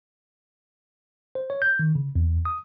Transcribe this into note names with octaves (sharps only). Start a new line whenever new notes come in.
C5
C#5
G6
D#3
C#3
E2
D#6